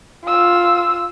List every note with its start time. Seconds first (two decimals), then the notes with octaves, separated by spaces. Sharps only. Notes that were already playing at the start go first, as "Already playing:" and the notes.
0.25 F4 E6